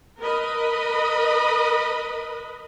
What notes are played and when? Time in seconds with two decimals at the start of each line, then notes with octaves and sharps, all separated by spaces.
0.19 A#4 B4 D#5 B5